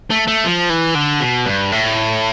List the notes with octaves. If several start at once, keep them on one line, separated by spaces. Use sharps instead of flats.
A3
A3
F3
E3
D3
B2
G2
A2